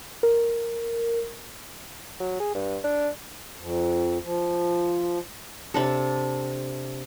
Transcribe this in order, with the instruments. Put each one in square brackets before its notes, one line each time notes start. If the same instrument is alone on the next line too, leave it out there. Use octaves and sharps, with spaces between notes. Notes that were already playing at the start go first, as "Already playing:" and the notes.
[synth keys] A#4
[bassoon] F#3
G#4
G2
D4
[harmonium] F2
F3
[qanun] C3 D4 A4